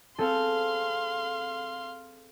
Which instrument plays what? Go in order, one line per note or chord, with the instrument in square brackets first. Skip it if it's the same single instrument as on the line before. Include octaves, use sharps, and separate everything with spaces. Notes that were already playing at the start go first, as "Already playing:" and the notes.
[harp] C4 G#4 A4 [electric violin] F5 C6